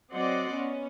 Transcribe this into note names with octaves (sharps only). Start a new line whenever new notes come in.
F#3 C4 D5 D#5 F#5 C6
B3 C#4